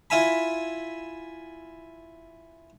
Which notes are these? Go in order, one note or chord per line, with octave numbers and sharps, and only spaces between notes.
E4 F4 E5 G#5 B5